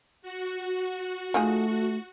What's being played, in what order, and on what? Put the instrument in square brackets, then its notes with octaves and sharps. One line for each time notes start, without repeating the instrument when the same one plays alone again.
[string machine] F#4
[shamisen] F3 D#4 G#4 [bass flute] A3